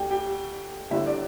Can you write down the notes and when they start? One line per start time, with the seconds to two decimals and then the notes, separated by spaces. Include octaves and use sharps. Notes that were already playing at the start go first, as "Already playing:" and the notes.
Already playing: D2 D3 G4 G5
0.11 G4 G5
0.91 G1 G2 D3 E4 E5
1.06 D4 D5